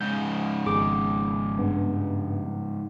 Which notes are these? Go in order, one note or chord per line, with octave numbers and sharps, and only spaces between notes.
G#2 C#3 G6
G#1 G#4 D6
G2 B3